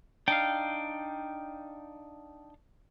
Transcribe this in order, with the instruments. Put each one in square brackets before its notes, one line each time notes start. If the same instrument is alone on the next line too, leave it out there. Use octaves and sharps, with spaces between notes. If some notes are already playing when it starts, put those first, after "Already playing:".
[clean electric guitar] D4 D#4 F5 [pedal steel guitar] G5